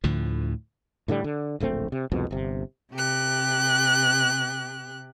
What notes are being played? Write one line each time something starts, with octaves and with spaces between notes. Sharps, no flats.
D2 A2 D3 F3
A2 D3 E3 G3
D3
D1 A#1 A3 C4
C3
C2 F2 G#2 B2
G1 C3
C3 G4 F#6